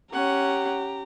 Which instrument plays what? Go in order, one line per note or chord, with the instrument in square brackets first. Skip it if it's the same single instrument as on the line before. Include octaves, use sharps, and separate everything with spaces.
[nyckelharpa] C#4 F#5 [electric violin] G4 A#5